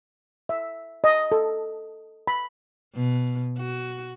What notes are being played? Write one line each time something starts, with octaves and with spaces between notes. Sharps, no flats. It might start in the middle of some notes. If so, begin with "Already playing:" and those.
E5
D#5
A4
B5
B2
F#4